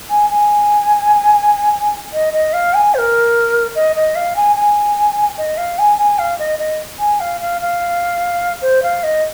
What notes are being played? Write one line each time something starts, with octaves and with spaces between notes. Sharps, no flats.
G#5
G#5
D#5
D#5
F5
G#5
C5
A#4
D#5
D#5
F5
G#5
G#5
D#5
F5
G#5
G#5
F5
D#5
D#5
G#5
F5
F5
F5
C5
F5
D#5